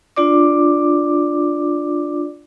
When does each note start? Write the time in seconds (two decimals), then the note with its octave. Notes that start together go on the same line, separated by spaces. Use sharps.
0.16 D4 F4 D5 D6